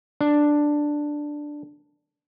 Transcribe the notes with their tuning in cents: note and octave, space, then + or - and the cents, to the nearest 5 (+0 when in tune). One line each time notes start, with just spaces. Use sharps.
D4 +5